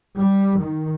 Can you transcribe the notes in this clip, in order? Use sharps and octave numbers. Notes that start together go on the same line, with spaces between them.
G3
D#3